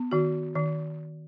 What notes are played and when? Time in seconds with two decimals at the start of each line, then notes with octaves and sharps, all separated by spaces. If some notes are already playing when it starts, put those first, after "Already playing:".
Already playing: B3
0.11 D#3 F#4
0.55 D#3